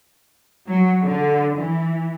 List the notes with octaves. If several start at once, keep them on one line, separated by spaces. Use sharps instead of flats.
F#3
D3
E3